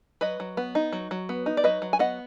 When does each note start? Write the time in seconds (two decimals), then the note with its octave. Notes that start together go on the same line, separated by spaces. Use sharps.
0.21 F#3 B4 D#5
0.40 F#3
0.57 B3
0.75 D#4
0.93 F#3
1.11 F#3
1.29 B3
1.46 D#4
1.57 D5
1.64 F#3 B4 D#5
1.82 F#3
1.93 G#5
1.99 B3 D#5 F#5